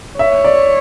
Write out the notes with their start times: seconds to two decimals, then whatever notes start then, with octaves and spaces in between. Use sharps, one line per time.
0.19 C#5 E5
0.44 D5